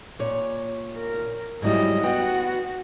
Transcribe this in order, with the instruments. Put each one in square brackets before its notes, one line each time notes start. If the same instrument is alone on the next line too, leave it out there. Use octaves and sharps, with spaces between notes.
[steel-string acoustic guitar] A#2 C#5
[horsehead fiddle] A#4
[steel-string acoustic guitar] G#2 F#3 G3 [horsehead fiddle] E4 D#5
[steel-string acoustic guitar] B3 G5 [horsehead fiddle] F#4